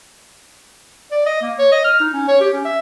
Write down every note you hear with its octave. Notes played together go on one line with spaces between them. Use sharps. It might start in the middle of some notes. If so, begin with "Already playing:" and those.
D5
D#5
A#3
C#5
D#5
F6
D#4
C#4
C#5
G4
C#4
E5